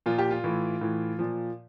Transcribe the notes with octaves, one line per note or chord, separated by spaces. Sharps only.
A#2 F3 F4
G4
F4
A2 E3
A2 E3
A#2 F3